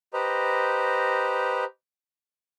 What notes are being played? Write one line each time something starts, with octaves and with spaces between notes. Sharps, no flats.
G4 B4 C5 D#5 A#5